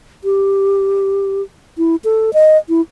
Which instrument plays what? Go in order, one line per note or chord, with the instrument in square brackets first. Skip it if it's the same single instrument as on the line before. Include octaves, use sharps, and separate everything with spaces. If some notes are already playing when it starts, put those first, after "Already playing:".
[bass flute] G4
E4
A4
D#5
E4